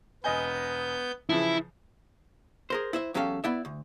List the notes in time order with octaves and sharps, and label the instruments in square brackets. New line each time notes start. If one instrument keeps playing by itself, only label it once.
[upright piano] E1 D#5 G#5 [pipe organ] B3 G6
[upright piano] C#3 E3 F3 [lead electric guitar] E4
[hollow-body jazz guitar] G#4 A#4 C5
E4 C5 E5
E2 F#3 C#4 G4 A4 F5
B3 E4 D5 E5
D2